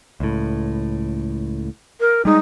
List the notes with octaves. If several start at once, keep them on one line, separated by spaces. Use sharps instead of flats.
C#2 A2
A#4
G3 G#3 D#4